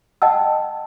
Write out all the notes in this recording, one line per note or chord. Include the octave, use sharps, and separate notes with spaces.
D#5 F#5 G5 A5 E6